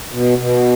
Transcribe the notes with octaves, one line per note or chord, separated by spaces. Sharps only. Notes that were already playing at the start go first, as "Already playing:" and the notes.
B2
B2